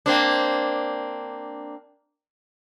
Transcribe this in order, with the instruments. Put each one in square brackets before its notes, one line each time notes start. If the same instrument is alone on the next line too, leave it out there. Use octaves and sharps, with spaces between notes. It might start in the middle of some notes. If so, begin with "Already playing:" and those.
[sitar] A#3 C4 D4